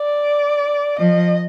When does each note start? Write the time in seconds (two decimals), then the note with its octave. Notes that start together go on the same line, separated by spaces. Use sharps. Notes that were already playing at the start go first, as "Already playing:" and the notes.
Already playing: D5
0.99 F3 D#5